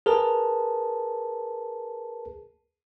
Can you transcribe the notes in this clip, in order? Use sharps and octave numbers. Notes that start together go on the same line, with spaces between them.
G#4 A#4 B4 A5